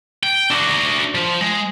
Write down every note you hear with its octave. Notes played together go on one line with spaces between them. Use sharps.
G5
D4 F#4
F3
G#3